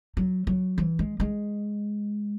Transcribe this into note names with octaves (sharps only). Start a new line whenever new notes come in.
F#3
F#3
E3
G#3
G#3